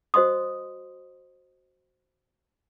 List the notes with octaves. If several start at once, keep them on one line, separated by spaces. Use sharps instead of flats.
F#4 C5 D#5 C6 D#6